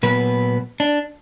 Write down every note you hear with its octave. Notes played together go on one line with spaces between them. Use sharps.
A#2 F#3 B3 B4
D4